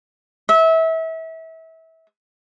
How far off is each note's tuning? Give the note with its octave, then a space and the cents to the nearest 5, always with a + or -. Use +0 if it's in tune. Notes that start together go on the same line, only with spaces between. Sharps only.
E5 -30